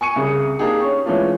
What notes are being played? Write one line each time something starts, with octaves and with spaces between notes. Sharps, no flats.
G#5 C#6 C#7 D#7
C2 C#3 G#4
A#3 D4 D#4 G4 G#4
C#4 C#6
E3 G#3 A3 C#4 D4 F4